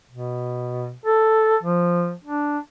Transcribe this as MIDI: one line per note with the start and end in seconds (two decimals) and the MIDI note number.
0.10 0.92 47
1.06 1.56 69
1.63 2.12 53
2.25 2.58 62